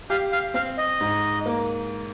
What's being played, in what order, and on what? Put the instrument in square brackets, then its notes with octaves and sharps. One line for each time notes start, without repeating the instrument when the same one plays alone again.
[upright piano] G4 [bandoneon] F5
[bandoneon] F5
[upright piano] C4 [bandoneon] F5
[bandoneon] D#5
[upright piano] G#2
A#3